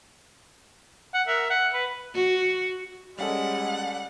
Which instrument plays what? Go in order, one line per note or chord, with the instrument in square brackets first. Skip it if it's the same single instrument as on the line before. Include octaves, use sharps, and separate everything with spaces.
[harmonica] F#5
A#4 E5
F#5
B4
[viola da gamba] F#4
[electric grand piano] G3 C#4 A4 [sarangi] G#3 [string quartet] F#5